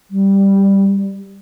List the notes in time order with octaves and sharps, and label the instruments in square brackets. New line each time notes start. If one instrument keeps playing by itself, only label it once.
[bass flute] G3